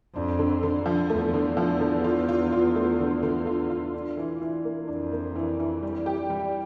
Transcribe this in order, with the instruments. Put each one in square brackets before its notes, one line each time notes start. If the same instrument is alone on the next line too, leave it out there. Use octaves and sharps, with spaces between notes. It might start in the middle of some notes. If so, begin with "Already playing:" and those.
[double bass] F2 [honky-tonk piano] D4
[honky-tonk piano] D3
D3
F3
[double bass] E2 [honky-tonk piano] A3
[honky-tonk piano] D3
F3
D3
F4
F4
F4
A3
D3
D3
F4
F4
D4
E3
E3
A#3
[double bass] F2 [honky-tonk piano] D4
[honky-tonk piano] A#3
E3
E3
G3
G4
G3